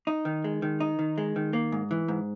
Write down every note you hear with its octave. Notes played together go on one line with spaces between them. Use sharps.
D#4
D#3
G#3
D#3
D#4
D#3
G#3
D#3
A#3
G#2
E3
G#2